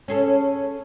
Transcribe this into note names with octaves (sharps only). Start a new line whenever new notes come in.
C#4 G#4 A4